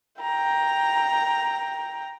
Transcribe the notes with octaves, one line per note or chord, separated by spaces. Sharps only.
G5 A#5